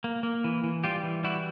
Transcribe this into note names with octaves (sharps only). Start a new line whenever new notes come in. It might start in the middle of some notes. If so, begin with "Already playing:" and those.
A#3
A#3
E3
E3
G3 F4 G4
E3
G3 E4 F#4